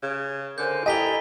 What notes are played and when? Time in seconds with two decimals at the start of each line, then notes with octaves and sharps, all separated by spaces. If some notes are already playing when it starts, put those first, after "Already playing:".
0.03 C#3
0.58 D3 A#4 C5 G#5 G6
0.86 E4 G4 A4 D#5 G#5 A#5 B6 G7